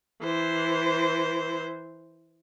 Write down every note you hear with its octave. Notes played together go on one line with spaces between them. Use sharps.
E3 C5